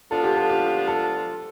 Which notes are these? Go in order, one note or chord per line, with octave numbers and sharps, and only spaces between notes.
F3 B3 D4 F4 A4
G4
A4
G4
A4